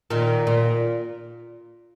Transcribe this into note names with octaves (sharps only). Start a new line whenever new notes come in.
A#2 D#3
A#2